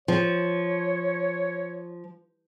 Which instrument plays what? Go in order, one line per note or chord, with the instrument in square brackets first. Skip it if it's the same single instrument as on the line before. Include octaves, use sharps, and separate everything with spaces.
[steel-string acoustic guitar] F3 [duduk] C#5